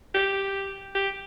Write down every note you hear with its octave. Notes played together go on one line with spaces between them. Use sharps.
G4
G4